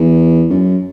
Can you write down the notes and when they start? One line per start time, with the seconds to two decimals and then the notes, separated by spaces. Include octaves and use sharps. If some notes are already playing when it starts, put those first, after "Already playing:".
Already playing: E2
0.50 F#2